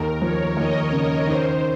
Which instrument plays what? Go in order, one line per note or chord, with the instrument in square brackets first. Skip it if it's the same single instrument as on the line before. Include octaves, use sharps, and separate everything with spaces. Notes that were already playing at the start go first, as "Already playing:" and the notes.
Already playing: [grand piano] D#2 [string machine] A#4
[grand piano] F3 [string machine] C#5
[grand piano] D#2 [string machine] D#5
[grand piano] C#3 [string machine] D#5
[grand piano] D#3 [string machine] C5